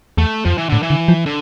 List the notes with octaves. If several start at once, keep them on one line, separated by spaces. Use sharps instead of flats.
E2 A3
F2 F3
E3
A2 D3
E3
D3
F3
D3